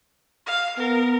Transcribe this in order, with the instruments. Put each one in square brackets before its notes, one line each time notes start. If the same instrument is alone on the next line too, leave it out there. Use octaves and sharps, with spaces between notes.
[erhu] F5
[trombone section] B3 [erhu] A#4